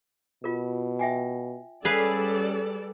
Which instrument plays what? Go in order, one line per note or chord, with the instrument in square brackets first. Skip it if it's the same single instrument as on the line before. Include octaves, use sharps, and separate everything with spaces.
[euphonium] B2 [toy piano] F4 A#4
[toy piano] E5 G5 G#5
[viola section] G3 A4 D5 [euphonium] C#4 [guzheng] G#4 B4 F5